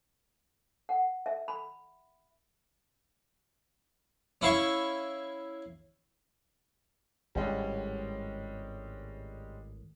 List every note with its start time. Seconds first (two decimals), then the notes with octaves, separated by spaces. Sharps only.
0.89 F#5
1.26 E5
1.48 B5
4.41 C#4 E4 F5 C#6
7.35 G#1 A2 G3 G#3 C#4